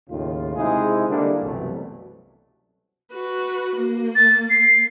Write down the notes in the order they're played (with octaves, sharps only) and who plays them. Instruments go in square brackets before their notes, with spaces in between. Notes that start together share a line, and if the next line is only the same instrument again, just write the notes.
[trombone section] D#2 A2 C#3 F4
C3 G#3 D#4 E4 G#4 C5
D3 G3 A#3 D4 E4
C2 F#2 B2 E3 F#3 A3
[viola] F#4 B4
A#3
[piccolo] A6
C7